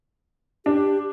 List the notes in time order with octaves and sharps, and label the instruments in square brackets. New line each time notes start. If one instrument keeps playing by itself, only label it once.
[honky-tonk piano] D4 [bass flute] G4